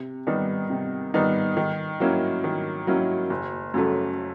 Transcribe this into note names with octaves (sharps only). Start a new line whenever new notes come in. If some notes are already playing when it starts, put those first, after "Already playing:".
Already playing: C3
D#3 G3 B3 D#4
C3
D#3 G3 B3 D#4
D#3
F#3 A#3 C#4 E4
D#3
F#3 A#3 C#4 E4
F#1
F#2 C#3 F#3 A3